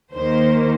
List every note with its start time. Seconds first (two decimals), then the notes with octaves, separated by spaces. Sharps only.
0.15 D#2 D#3 A#3 C5